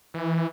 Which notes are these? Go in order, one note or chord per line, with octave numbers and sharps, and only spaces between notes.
E3